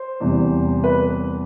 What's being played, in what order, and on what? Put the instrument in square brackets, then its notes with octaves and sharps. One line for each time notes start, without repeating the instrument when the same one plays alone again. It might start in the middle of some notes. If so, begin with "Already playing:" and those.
Already playing: [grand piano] C5
E2 C3 G3
B4